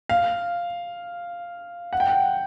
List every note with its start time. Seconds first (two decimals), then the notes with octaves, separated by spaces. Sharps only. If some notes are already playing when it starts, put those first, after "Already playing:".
0.09 F5
1.93 F#5
2.00 G5
2.08 F#5